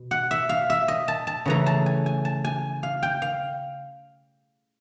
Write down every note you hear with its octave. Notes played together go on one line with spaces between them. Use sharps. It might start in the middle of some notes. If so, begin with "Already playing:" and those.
Already playing: B2
F#5
E5
F5
E5
D#5
A5
A5
C#3 E3 A3 A#5
A5
G#5
G#5
A5
G#5
F5
G5
F5